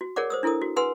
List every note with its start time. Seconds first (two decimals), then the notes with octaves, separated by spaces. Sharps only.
0.01 F#4
0.16 G#4 A#4 C#5 D5 F#5 D6
0.30 C5 D#6 E6
0.43 D4 E4 A4 A#4 D#6
0.61 F#4
0.76 G#4 B4 F#5 G#5 C6 E6